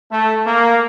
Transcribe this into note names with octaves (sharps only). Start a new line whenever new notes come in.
A3
A#3